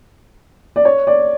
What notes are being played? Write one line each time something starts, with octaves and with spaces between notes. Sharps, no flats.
D5
C#5
D5